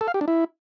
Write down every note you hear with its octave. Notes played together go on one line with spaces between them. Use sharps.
A4
F5
G4
D4
E4